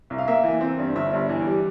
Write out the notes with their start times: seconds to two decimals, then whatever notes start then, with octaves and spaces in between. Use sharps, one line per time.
0.10 C2
0.18 F5
0.28 A#3 E5
0.44 E3
0.61 C4
0.79 G2
0.96 G1 E5
1.13 G2
1.29 E3
1.47 G3